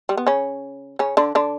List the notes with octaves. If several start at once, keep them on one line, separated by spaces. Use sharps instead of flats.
G3
B3
C#3 C#4
C#3 C#4
D3 D4
D3 D4